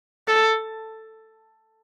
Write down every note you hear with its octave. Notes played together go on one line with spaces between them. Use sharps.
A4